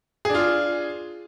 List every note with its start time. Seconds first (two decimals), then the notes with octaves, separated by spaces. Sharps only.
0.25 G#4
0.30 D4
0.34 F4